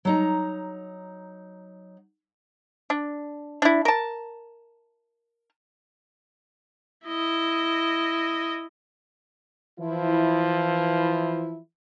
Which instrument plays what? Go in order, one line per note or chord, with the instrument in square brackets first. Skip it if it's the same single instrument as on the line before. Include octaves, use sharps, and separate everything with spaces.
[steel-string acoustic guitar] F#3 D#4 A#5
[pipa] D4
D4 E4
A#4 A5
[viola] E4 D#5
[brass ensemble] E3 F3 E4